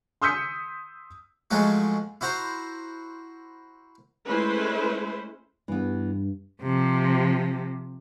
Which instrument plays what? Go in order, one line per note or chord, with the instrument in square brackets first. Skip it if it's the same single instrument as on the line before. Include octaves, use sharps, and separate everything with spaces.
[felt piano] C6 D#6 E6 G6 B6 C#7
[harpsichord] F3 F#3 G#3 A3 F#4
E4 F#4 C5 A#5
[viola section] G#3 A3 C#4 E4 B4 C5
[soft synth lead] G2 [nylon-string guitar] E3 B3
[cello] C3 F3